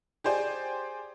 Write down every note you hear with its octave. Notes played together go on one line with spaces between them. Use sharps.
G4 G#4 C5 D5 G#5